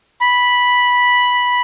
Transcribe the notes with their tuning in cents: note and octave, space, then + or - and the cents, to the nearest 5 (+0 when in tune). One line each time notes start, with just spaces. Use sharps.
B5 -5